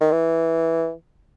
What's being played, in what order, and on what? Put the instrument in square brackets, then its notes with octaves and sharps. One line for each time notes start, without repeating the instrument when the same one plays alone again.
[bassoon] D#3
E3